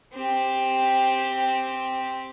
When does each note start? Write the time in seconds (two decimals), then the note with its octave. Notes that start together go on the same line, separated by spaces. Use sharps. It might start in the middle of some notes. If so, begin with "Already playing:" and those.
0.14 C4 G4